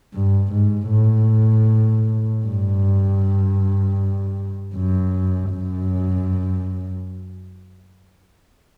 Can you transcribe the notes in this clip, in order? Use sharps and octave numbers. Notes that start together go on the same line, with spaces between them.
G2
G#2
A2
G2
F#2
F#2